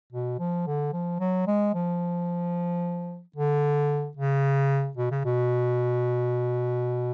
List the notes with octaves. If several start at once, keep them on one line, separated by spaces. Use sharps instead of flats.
B2
F3
D3
F3
F#3
G#3
F3
D3
C#3
B2
C#3
B2